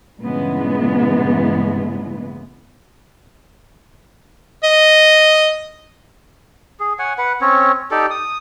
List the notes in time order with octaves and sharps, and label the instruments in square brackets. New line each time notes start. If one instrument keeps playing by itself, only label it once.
[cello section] G2 A#2 C#3 E3 G#3 B3
[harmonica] D#5
[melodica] G#4
C#5 F#5 G#5
B4 F#5
C4 C#4 C#5
D#4 G4 A4 D5
D#6